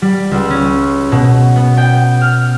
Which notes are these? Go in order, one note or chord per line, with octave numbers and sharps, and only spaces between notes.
G3
C#2
C#4
B2
B3
G5
F6